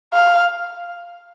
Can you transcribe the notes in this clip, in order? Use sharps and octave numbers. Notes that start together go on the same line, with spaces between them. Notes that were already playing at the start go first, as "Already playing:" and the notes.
F5